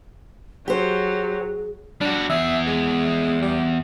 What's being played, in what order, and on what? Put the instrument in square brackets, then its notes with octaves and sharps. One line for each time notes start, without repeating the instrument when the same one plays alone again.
[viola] F#3 [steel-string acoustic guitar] G4 C5 [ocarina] G#4
[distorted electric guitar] G3 F#4 [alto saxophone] D4
[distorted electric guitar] E2 G#4 [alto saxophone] E5
[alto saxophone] G#3
G3